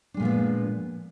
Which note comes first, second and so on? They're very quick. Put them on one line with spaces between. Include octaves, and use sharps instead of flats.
D4 G#3 A#2 F3 B3